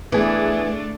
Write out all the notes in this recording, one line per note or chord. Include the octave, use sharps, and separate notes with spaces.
E3 A3 B3 D4 G#4